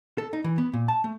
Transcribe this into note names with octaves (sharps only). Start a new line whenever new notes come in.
A4
D#4
E3
B3
A#2
A5
A3